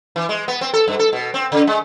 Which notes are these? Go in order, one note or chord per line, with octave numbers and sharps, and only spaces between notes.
E3
G#3
B3
C4
A4
G2
A4
B2
C4
C#3
G#3